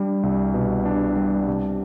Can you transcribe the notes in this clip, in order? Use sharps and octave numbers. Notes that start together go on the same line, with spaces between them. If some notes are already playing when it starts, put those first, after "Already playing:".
Already playing: G3 D4
C2
B2
D4
G3
C3